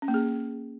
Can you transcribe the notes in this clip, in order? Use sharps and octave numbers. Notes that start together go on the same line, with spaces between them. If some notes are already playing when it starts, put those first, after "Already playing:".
C#4
A#3
G#4